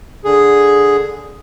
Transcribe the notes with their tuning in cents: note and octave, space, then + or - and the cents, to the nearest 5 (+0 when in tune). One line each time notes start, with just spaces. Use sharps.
D3 +0 G#4 +0